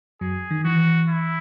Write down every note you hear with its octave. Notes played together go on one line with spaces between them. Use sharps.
F#2 F#3 G#4
D#3
E3 F#4
E4